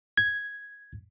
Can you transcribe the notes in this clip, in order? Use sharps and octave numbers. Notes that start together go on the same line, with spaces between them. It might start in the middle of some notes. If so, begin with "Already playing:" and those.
G#6